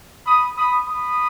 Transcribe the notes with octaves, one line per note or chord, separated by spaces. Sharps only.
B5 D#6
B5 D#6
B5 D#6